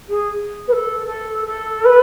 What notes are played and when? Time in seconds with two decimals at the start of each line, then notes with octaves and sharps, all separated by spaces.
0.09 G#4
0.68 B4
0.72 A4
1.07 A4
1.46 A4
1.85 B4